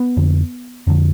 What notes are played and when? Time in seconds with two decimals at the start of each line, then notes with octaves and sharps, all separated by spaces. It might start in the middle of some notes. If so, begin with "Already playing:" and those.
Already playing: B3
0.17 F2 D3
0.87 F2 D3